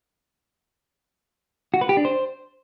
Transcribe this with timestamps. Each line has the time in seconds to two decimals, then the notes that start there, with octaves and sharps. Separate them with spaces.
1.74 F#4
1.81 B4
1.89 G4
1.97 D4
2.05 C5